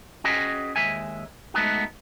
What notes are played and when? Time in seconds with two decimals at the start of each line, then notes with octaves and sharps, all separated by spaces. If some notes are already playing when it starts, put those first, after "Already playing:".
0.24 C#4 F#4 G#4 B4 D#5 G5
0.76 D#2 G#3 E5 G#5
1.54 G#3 A3 B3 D#4 F#4